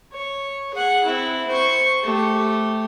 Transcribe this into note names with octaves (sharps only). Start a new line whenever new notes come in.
C#5
G#4 F#5
C4 E4
C5 C#6
A3 G4